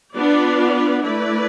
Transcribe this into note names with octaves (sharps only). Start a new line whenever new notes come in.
B3 D4 F4 B4 D5
A3 E4 B4 D5